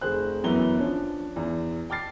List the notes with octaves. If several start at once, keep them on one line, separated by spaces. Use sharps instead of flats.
F1 G#4 C5 F#6
F#2 E3 B3 G7
F3 C#4 D4
E2
G5 D6 F6 A6 C7